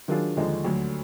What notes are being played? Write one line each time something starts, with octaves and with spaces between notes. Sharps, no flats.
D#3 F#3 D4 F4 G#4
D#2 D3 F3 G#3 D#4
D2 D3 F#3